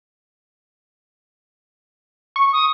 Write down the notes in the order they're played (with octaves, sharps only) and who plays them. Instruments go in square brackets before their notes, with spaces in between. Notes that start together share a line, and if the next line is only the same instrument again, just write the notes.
[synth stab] C#6
[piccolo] D#6